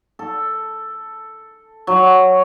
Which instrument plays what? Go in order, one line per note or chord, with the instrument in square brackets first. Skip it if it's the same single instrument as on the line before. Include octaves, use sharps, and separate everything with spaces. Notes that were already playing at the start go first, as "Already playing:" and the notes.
[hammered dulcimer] A4
F#3